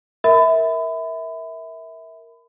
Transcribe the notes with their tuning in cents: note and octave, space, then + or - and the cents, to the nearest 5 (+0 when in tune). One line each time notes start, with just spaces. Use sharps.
A#4 +0 E5 -20 B5 +30